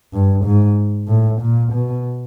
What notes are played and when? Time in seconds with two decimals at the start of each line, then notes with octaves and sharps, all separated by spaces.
0.13 G2
0.45 G#2
1.08 A2
1.41 A#2
1.73 B2